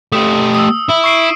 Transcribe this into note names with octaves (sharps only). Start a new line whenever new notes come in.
A3 G4 D#6
D#6 E6
E4
C#6 C7 D7